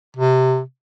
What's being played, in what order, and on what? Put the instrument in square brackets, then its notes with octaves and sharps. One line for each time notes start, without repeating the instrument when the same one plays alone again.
[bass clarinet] C3